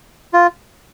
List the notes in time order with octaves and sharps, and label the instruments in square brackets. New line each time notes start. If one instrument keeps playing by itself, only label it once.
[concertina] F4